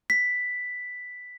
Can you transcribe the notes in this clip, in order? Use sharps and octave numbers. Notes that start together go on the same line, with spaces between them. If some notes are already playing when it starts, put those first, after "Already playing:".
B6